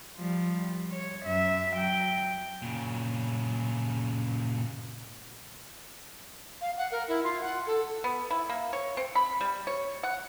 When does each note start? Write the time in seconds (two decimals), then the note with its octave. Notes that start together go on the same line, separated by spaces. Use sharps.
0.16 F3 G3
0.91 C#5
1.25 F#2 E5
1.72 F#3 G5
2.62 A#2 C#3
6.60 F5
6.76 F#5
6.91 A#4
7.07 E4
7.23 F4
7.40 F#5
7.66 A4
8.04 B3
8.31 E4
8.49 A#3
8.73 C#5
8.97 C4
9.15 B5
9.41 G3
9.67 C#5
10.03 F#5